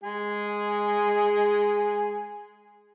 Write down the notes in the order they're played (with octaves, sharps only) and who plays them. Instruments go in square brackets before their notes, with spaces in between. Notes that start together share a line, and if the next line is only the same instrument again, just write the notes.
[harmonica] G#3 G#4